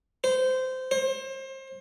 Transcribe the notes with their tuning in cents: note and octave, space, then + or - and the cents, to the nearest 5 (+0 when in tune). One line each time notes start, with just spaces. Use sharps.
C5 -20
C5 +30